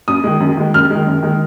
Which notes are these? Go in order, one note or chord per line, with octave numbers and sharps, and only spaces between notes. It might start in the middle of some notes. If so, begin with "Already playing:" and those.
F#2 D#6
D#3 G#3
F#2
D#3 G#3
F#2 F6
D#3 G#3
F#2
D#3 G#3